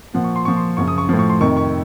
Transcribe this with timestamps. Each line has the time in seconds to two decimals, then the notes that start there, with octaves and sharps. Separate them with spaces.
0.14 A#2 F3 F#5
0.24 C#6
0.36 C6
0.45 A#2 F3 C#6
0.57 C6
0.77 F#2 C#3 F3 C#6
0.88 D#6
0.98 C#6
1.09 A2 F3
1.19 C#6
1.29 C6
1.41 F2 C3 D#3 C#6
1.57 C#6